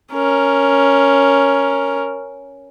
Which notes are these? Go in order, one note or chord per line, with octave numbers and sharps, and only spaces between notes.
C#4 A#4